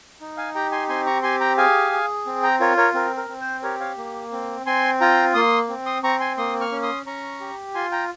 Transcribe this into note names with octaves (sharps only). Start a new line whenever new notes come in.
D#4
F5 G#5
G4 G5 A#5
G#5 C6
C4 G#5 C6
A#5 C#6
G4 G#5 C6
G5 A#5
G#4 F5 G#5
G#4
C4
G5 A#5
F4 A#4 C#5
A#4 C#5
C4 A#4
A#4
C4
C5
G4 A#4 C#5
C#5 F5
A#3
C4
C4 G#5 C6
F4 G5 A#5
A#3 C6 D#6
C4
C6 D#6
C4 A#5 C#6
G#5 C6
A#3 C6 D#6
C#6 F6
C#4
C6 D#6
C#4 A#5 C#6
G4
F4 G#5 C6
G5 A#5